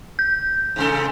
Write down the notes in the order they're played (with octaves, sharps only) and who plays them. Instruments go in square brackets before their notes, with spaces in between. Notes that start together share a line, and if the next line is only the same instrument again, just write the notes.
[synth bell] G6
[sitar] G#2 C3 A4